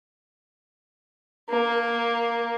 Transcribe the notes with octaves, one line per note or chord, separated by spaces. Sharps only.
A#3